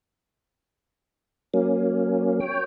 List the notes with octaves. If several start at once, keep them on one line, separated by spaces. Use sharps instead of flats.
F#3 A#3 C#4
C#5 G5